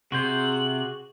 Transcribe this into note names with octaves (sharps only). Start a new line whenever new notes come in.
C3 F#4 G#4 C6 G6 F#7